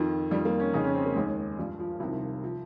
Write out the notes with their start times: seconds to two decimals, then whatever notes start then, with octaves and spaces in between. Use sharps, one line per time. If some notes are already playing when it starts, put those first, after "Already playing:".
Already playing: F2 D#3
0.31 F2 G3
0.34 D#3
0.45 A#3
0.60 C#4
0.73 F2 C#3 F3 D#4
0.84 C#4
0.94 C4
1.05 A#3
1.16 D#2 D#3 G#3
1.58 G2 F3 G3
1.79 F3
2.00 C2 C3 D#3 F3
2.44 F3